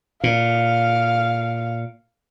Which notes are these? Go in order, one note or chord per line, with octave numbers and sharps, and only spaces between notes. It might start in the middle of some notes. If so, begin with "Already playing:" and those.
A#2 F5